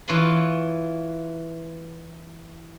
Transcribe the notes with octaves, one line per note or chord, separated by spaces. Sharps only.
E3 F4 C#5 F5 B5 C6